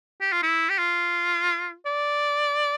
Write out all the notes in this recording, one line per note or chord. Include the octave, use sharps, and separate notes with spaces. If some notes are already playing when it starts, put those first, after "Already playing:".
G4
F4
E4
G4
F4
D5